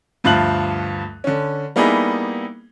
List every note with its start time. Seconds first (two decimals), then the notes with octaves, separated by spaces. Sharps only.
0.24 D2 G2 F3 F4 F#6 F#7
1.24 D3 C#4
1.76 G3 A#3 B3 D#4 E4 G#4